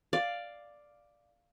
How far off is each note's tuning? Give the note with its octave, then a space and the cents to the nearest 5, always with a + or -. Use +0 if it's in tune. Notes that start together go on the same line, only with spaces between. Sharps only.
D5 +5 F5 +0